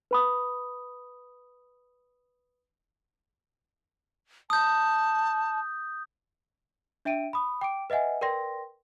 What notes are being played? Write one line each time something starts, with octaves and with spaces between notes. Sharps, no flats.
B4 B5 D#6
A5 D#6 G6
D4 E5 G5 D7 D#7
B5 D#6
G5 D6 D7
B4 D#5 E5 F#5 G#5
A#4 B4 D5 G5 C6 A#6